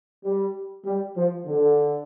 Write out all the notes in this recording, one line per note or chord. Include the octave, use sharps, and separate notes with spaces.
G3
G3
F3
D3